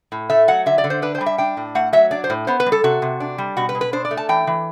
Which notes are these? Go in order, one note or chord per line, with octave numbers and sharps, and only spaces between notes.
A2
A3 E5
F#3 F#5
D3 E5
D5
D3
C5
D4 B4
C5
G3
E5
D4 G5
A2
A3 F#5
F#3 E5
D4 D5
C5
A2
B3 C5
B4
G3
A4
C3 F#4
C3
D4
G3
B2 F#4
B4
B2
B4
D4 C5
D5
A3
A5
E3 G5
E3